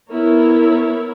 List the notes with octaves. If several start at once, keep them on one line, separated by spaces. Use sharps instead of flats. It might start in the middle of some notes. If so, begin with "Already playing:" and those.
B3 E4 A#4 C#5